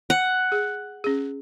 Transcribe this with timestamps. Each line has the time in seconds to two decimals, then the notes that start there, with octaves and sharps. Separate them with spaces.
0.10 F#5
0.52 G#4
1.04 C#4 G#4